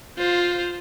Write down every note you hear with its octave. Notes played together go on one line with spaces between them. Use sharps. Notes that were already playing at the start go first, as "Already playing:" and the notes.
F4 C5